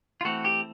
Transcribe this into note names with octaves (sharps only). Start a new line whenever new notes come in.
F4
E3 A3 C4 F#4
G4